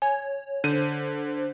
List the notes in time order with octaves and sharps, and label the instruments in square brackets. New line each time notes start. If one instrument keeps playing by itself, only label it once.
[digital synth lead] C#5 [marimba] G#5
[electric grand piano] D3 D#7 [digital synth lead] C5